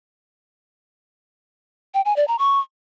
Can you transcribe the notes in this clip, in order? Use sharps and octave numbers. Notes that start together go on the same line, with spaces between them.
G5
G#5
D5
A#5
C#6